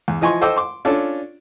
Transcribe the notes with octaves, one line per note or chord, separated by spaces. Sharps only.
E2
E3 F3 D#5 G#5 C6 C#6
A4 C5 D#5 G5 D6 E6
C6 D6
C#4 D4 F4 A4 D5